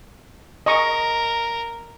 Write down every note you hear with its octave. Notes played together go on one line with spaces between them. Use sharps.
A#4 D#5 C#6